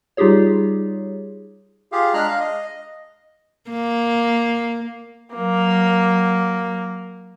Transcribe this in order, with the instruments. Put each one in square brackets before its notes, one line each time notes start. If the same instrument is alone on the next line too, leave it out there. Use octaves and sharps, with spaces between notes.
[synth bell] G3 D#4 F4 G4 G#4 C#5
[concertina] F4 G4 G#4 F5
G#3 D4 G#4 A#5 F6 F#6
F5
D#5
[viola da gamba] A#3
[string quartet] F#3 A#3